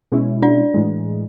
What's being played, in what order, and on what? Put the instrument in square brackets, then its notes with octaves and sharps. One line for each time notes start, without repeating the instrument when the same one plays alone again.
[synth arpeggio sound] B2 G#3 C#4 E4
[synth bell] D4 D5
[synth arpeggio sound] A2 E3 G#3